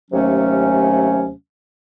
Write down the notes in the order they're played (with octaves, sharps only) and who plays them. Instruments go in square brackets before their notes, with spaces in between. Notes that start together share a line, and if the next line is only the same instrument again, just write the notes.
[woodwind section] D#2 C3 F#3 A3 C#4